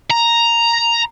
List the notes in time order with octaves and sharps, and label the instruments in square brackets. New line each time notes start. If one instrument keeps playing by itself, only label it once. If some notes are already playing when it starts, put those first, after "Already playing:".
[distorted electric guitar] A#5